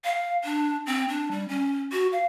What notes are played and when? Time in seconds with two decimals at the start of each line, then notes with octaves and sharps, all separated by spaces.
0.05 F5
0.44 D4
0.87 C4
1.09 D4
1.31 G3
1.49 C#4
1.92 F#4
2.12 F5